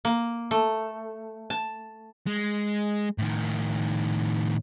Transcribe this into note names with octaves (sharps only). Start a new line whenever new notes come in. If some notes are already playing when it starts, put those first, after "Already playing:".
A#3
A3
A5
G#3
A2 D#3